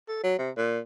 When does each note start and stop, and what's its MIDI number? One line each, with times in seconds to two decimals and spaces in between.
0.08 0.20 69
0.24 0.38 54
0.39 0.51 48
0.57 0.79 46